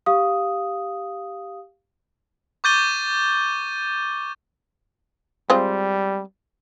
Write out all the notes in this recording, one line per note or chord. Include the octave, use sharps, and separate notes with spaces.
G4 F5 D#6
C#6 D6 G6 A6 D#7 G7
G3 G#3 C4 F4